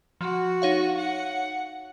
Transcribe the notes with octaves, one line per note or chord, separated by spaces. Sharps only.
F3 F#4
D#4 C#5 F5
F#5